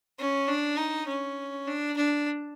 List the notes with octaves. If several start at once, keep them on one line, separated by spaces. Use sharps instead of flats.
C#4
D4
D#4
C#4
D4
D4